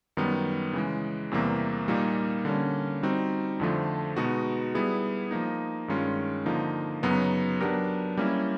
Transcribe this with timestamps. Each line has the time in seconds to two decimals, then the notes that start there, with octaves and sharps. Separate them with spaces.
0.17 F#2 D#3 G3 B3
0.73 C#3 E3 G#3
1.31 E2 C3 E3 G3 A#3
1.88 A#2 G3 A#3 D#4
2.45 D3 G3 A#3 C#4
3.03 G3 C4 D#4 F#4
3.60 F2 D3 F3 A3
4.16 B2 G#3 B3 D#4 F#4
4.75 G3 B3 E4 G#4
5.31 F3 A#3 D#4
5.88 G2 D#3 G#3 C#4 F4
6.46 D3 F3 A#3 D#4
7.03 F#2 C#3 F#3 B3 D#4
7.60 F#3 B3 D4 G4 A#4
8.17 G3 A#3 C#4 E4